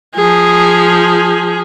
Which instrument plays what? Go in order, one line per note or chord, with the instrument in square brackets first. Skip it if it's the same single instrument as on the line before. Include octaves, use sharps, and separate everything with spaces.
[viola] F3 G#4